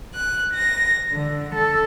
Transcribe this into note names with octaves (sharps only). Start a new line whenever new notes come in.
F#6
A#6
D3
A4